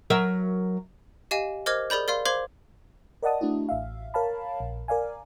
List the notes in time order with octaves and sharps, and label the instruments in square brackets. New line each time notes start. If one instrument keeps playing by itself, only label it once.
[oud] F#3 A#4 E5
[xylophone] G4 D#5 F5 G#5 D#7
A#4 C5 D#5 D6 F6 G#6
G#4 A#4 D5 B5 G6
A#4 D5 F5 C6
C5 F5 C6 D6 G#6 F#7
[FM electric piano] A#4 D5 D#5 F#5 A5 D#6
A3 D4 E4 F#4
A1 E5 F5
A#4 C#5 F5 A5 B5
A#1
A#4 D5 F5 G#5